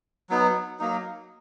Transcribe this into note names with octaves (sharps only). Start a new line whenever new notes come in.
F#3 B3 D#4
F#3 A#3 D#4